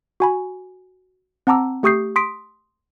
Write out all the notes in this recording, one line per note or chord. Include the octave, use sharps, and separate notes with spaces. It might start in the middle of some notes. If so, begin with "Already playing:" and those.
F#4 G#5 B5
C4 F#5 A5 A#5 D6 E6
A3 G4 C#6 D#6 G6 C7
C6 D#6 B6 D7